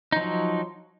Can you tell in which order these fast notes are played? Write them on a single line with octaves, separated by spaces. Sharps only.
D#4 F3 F#3